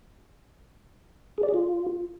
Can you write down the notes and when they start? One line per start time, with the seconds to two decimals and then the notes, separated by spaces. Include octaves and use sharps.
1.38 G#4
1.43 D5
1.49 G#4
1.54 F4